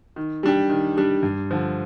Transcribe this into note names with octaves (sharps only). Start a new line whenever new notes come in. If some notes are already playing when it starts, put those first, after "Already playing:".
D#3
G3 D4 G4
D#3
G3 D4 G4
G2
D3 F3